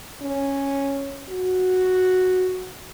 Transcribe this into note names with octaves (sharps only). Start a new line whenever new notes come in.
C#4
F#4